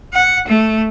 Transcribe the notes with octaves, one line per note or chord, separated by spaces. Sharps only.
F#5
A3